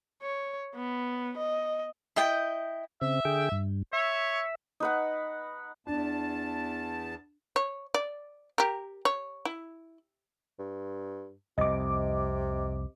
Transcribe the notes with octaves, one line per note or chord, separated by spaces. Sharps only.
C#5
B3
D#5
E4 D#5 G5
C#3 C4 E5
D3 G#4 G5
G2
C#5 E5
D#4 B4 F#5
E2 D4 A5
C#5
D5
G4 A#4
C#5
E4
G2
C2 F2 C3 D#5 D6